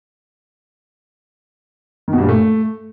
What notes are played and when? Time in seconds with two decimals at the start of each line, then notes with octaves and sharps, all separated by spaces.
2.08 D#3
2.13 B2
2.18 G2
2.23 A#2
2.29 A3